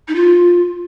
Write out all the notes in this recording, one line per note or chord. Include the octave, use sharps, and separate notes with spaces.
D#4
F4